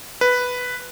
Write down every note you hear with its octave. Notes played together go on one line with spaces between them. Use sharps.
B4